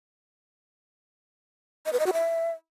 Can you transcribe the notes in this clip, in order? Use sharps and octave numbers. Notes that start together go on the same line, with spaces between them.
D#5
B4
D#5
F#4
E5